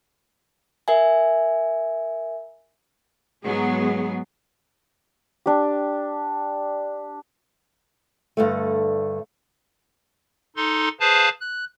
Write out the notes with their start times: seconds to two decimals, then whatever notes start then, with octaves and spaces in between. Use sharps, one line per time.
0.88 A#4 E5 G#5
3.45 G#2 F#3 G#3 B3 G#4
5.46 D4 G4
8.37 G2 D3 A3
10.56 D#4 A4 C6
11.00 G#4 B4 C5 F5 A5
11.41 F#6